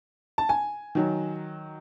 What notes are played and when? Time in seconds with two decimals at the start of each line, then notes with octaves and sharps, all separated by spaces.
0.38 A5
0.49 G#5
0.95 D#3 F#3